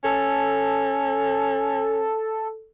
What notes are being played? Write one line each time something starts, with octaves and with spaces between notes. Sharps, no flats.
C#4 A4